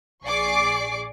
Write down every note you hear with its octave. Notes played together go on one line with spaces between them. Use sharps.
A#1 G#4 D5 C#6 D6 C7